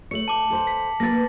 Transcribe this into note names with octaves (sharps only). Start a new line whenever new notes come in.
A3 C#5 C#7 F#7
A5 D6 F#7
A4 C5
B6
A#3 B4 A6 A#6